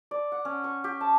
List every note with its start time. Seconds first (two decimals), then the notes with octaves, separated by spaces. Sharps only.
0.11 D5
0.32 F#5
0.45 C#4
0.64 C#6
0.84 G4
1.01 A5